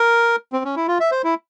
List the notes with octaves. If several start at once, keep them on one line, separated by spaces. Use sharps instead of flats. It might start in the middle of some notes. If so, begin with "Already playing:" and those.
Already playing: A#4
C4
C#4
E4
F4
E5
C5
E4